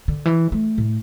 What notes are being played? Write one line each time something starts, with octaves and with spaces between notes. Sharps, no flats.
D3
E3
A3
A2